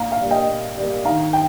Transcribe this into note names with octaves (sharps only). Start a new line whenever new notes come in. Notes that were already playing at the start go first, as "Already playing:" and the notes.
Already playing: A#2 F5 A#5
F5
G3 A#3
D#5 G5
A#2
G3 A#3
D#3 F5 A#5
G5